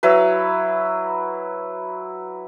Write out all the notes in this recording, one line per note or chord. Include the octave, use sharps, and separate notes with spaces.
F#3 E4 B4